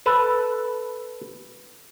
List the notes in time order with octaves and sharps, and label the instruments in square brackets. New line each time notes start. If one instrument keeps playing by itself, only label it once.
[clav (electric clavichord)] A4 B4 A5